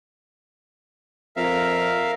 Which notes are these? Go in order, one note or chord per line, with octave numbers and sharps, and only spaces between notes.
F2 A#4 E5 F5